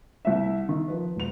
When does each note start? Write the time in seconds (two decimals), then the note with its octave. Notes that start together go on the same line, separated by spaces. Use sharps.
0.25 C2 E5
0.69 D#3
0.88 F3 B4
1.16 E1 F7